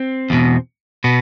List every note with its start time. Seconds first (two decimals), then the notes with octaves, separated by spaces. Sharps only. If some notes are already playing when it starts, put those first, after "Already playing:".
Already playing: C4
0.30 E2 B2
1.04 B2 B3